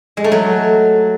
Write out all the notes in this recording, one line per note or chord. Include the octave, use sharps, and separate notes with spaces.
G#3
A3
F#3